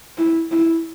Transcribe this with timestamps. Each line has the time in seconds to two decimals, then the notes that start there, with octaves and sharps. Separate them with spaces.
0.18 E4
0.51 E4